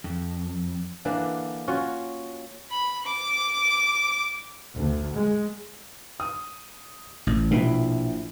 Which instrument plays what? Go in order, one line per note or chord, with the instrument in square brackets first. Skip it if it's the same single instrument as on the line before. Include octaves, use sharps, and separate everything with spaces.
[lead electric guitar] F2
[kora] D3 E3 A#3 D4
C#4 F4 F#4 C#5
[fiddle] B5
D6
[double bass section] D2
G#3
[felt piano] D#6
[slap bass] A1
[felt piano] A#1 E4 [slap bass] B2